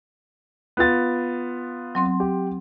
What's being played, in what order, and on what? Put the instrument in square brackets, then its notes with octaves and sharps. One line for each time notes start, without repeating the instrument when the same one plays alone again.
[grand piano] B3 F4 A6
[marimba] F#3 C4 C6
[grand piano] G4